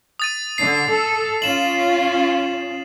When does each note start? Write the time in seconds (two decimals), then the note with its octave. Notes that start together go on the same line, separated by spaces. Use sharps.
0.20 D#6 A6 D#7
0.58 D3 C7
0.88 A4
1.42 C#4 F4 E7 F#7